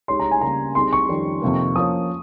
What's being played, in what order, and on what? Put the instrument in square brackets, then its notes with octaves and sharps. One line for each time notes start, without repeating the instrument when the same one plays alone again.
[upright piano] G#3 D#4 G4 C#5 [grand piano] C6
[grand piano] A#5
G#5
[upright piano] C#3 G3 A#3 [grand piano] A#5
[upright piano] G3 C4 D#4 G#4 [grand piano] C6
[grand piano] C#6
[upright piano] F2 D#3 G3 C#4 G4
F2 C3 D#3 A#3
[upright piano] F3 A#3 C#4 [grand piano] D#6